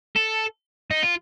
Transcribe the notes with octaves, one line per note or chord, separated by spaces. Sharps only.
A4
D#4
F4